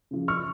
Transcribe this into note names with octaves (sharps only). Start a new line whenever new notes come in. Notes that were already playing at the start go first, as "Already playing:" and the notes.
C#3 F3
C#6 F6